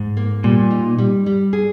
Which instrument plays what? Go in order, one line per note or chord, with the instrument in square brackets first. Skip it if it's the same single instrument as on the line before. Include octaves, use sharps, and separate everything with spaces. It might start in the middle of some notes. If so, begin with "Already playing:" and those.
Already playing: [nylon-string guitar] G#2
A#3
[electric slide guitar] A#2 [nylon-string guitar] G3
[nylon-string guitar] D#4
G3
G3
G#4